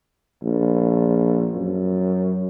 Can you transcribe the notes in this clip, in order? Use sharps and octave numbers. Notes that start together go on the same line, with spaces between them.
A#1
F#2